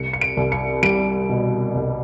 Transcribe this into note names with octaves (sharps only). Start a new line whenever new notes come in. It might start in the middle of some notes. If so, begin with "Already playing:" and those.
Already playing: C2 C#7
C#7
D7
C2
C#7
G3 D7
B2
C2